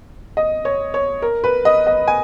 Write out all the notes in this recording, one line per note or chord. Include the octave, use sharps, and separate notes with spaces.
D#5
C#5
C#5
A#4
B4
D#5
D#5
G#5